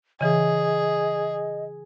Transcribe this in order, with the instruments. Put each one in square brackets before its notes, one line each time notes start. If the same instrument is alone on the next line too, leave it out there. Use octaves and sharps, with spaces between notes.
[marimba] C#3 E3 [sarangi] G#4 [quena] D#5